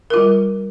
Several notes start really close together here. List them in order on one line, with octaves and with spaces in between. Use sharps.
A#4 F4 G3